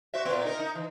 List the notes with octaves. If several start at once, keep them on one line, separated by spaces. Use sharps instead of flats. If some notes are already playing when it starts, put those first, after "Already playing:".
F#4 C5 E5
A#2 B3
D#4 A#4
D#4
E3